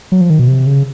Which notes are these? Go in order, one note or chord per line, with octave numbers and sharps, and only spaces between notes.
F#3
F3
D#3
B2
C3
C#3